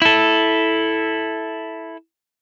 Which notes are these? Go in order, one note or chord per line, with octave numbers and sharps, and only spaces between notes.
E4 A4